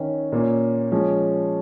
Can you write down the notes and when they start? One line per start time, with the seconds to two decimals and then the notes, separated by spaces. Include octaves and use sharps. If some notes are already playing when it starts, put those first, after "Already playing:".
Already playing: D#3 C#4
0.32 A#2 A#3 C#4
0.92 F3 G#3 C#4